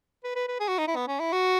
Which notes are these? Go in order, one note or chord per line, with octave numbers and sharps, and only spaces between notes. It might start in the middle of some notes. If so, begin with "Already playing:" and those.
B4
B4
B4
G#4
F#4
D#4
E4
B3
C#4
E4
F#4